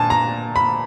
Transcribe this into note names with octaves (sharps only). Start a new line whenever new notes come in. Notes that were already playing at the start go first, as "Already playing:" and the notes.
Already playing: A#2 D4 G#5 A5
A#5
B5